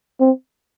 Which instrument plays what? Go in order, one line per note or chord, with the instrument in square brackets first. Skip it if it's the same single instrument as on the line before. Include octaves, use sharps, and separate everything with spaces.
[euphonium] C4